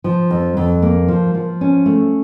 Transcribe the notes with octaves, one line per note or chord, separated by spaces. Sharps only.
F3
F2
F2
A#3
F3
F3
C#4
A3